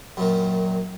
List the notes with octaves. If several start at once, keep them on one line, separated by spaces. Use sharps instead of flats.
F#2 A#2 D#3